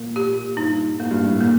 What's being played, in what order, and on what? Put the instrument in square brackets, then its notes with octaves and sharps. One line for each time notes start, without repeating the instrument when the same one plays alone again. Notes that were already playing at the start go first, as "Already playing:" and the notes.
Already playing: [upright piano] A#2 [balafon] A#3
[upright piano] A#2 [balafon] G4
[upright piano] G2 [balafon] D#4
[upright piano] A2 [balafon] A#3
[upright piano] G2
A2
[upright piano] A#2 [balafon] A#3